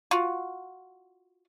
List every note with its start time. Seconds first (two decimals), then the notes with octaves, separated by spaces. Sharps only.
0.11 F4 F#4